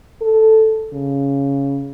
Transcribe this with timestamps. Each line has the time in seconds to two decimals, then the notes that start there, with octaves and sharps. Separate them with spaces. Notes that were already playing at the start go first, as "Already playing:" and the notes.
0.21 A4
0.93 C#3